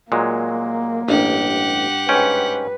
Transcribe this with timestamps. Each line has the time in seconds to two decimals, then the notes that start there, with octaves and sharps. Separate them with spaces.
0.12 A#2 F#3 G#3 A#3
1.08 A1 G2 G4 F#5
2.09 G#2 C#4 B4 G5